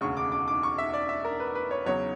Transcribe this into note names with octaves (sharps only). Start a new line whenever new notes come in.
E1 D2 C#3 C#6
D6
D6
D6
C#6
E5
D5
E5
A#4
B4
B4
C#5
E2 C#3 F#3 C#5